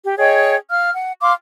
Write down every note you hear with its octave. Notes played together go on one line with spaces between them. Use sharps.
G4
G#4 C#5 D#5 G5
F5 F6
F#5
F5 C6 D6